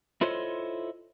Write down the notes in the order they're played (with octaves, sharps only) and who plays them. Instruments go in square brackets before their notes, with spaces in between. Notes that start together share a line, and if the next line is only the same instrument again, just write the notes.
[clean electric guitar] E4 F4 A4 C5 C#5 D#5